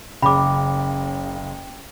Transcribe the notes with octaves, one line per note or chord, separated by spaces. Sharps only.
F#1 C#3 G5 B5 D6